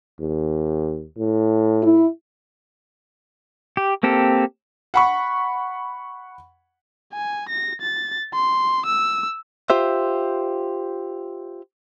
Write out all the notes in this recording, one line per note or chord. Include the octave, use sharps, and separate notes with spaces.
D#2
A2
E4
G4
A#3 C4 G4 A4
F#5 B5 C#6
G#5
A#6
A6
C6
E6
F4 G4 C5 E5